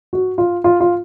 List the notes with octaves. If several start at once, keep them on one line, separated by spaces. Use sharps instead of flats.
F#4
F4
F4
F4